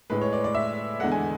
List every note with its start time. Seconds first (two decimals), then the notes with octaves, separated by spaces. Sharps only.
0.10 A2 G#3 B4
0.22 C#5
0.33 D5
0.44 D5
0.55 E5
1.00 E2 D3 G#3 F#5
1.12 G#5